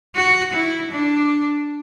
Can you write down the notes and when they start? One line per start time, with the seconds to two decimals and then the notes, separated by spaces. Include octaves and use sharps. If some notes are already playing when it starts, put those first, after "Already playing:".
0.16 F#4
0.54 E4
0.91 D4